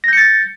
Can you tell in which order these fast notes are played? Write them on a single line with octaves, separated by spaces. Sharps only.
A#6 G6 C#7 A6